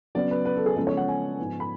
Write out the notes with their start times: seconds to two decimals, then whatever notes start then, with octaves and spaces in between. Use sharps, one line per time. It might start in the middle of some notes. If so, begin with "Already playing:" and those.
0.15 C#3 F#3 B3 D5
0.31 B4
0.45 B4
0.56 A4
0.66 G#4
0.76 C#3 F3 G#3 B3 A4
0.87 C#5
0.97 F#5
1.08 G#5
1.39 G#2 F3 B3
1.60 B5